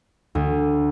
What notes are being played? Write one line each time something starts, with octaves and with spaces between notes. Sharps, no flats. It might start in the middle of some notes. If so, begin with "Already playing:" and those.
D2